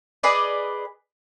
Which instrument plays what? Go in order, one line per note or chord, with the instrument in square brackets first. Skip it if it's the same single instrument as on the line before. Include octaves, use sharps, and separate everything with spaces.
[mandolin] G#4 B4 D5 D#5